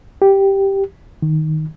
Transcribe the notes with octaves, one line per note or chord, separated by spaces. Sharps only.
G4
D#3